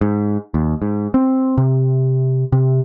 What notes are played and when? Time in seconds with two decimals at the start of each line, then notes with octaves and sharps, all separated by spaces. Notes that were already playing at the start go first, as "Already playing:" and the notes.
0.01 G#2
0.54 D#2
0.82 G#2
1.14 C4
1.58 C3
2.52 C3